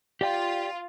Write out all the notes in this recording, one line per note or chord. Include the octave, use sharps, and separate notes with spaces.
F4 G4 D5 G5